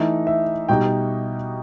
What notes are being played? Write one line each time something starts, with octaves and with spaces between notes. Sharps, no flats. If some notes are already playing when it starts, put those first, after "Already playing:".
Already playing: E3 A3 D#4
E5
B2 G3 D#4 G5